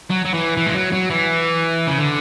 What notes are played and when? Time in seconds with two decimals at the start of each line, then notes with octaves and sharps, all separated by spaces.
0.10 F#3
0.25 F#3
0.34 E3
0.57 E3
0.66 G#3
0.75 F#3
0.92 F#3
1.10 E3
1.87 C#3
1.98 D3